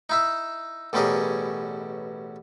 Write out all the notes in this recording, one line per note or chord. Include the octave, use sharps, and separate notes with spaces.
D#4 E4 E5
A1 B2 G3 C#4 G#4 A#4